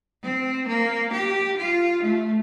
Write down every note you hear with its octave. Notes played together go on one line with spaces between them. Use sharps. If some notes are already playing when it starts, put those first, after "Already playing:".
C4
A#3
G4
F4
A3